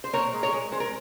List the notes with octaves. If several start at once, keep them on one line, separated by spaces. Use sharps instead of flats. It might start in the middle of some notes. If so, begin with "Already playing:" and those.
C5
A#2 A#4 C#5
G#3
A#4 C#5
G#3
G#3 C5
A#4